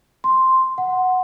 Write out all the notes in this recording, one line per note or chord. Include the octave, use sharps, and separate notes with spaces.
C6
F#5